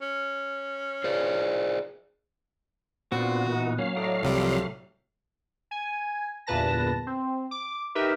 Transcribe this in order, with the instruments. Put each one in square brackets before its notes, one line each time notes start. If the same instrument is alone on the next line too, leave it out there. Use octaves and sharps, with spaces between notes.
[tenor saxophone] C#4
[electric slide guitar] G#4 C5 D5
[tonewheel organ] A#2 B3 [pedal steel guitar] C4 D4 F4 [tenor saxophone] F#4
[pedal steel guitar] E3 D#4
[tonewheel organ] F#3 F5 [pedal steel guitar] A#3 C#4
[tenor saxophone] A2 [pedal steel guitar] D5 D#5 A#5
[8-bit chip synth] C2 C3 G3 [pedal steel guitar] F3 A#4
[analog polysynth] G#5
G1 E2 A#2 B4 A5 A#6
C4
D6
D#4 G4 A#4 B4 E5